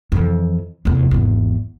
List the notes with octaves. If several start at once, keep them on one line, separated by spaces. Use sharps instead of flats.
F2 E3
F1 E2
G#1 E2